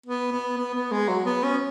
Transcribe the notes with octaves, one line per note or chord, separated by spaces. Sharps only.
B3
B3
B3
B3
G#3
F#3
B3
C#4